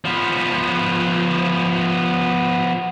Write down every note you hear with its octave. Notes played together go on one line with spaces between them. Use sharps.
F3 B3